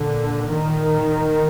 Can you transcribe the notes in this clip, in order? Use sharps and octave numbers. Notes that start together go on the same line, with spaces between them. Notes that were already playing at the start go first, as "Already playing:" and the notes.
Already playing: A#2 D3
D#3